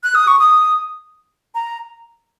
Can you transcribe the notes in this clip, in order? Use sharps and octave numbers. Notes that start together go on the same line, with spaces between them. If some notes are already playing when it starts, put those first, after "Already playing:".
F#6
D#6
C#6
D#6
A#5